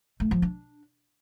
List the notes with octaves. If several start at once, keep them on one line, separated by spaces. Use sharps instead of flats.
A3
F3
D4